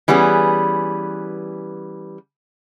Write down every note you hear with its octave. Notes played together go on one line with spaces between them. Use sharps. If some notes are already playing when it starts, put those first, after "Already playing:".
E3 G3 B3 C#4 G#4